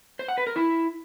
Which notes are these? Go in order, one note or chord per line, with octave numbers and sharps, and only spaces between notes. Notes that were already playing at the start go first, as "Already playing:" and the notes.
C5
F#5
B4
A#4
E4